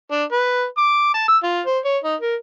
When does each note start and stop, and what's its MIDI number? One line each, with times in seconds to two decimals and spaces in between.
0.11 0.24 62
0.32 0.64 71
0.78 1.11 86
1.14 1.25 81
1.28 1.37 88
1.43 1.61 65
1.66 1.79 72
1.84 1.98 73
2.04 2.15 63
2.20 2.35 70